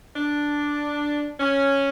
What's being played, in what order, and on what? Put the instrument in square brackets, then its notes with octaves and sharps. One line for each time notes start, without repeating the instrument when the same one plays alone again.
[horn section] D4
C#4